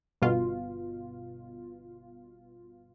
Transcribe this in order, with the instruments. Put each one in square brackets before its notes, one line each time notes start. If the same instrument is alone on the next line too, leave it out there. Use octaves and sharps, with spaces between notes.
[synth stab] G1 B2 F4